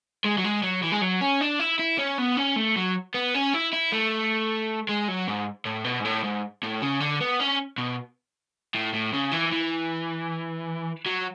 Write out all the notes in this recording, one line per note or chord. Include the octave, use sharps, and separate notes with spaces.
G#3
F#3
G#3
F#3
E3
G#3
F#3
C#4
D4
E4
E4
C#4
B3
C#4
A3
F#3
B3
C#4
E4
E4
A3
G#3
F#3
G#2
A2
B2
G#2
A2
G#2
A2
C#3
D3
B3
C#4
B2
A2
A2
C#3
E3
E3
F#3